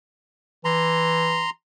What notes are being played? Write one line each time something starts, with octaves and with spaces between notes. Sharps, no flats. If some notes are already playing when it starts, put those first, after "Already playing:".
E3 A#5 C6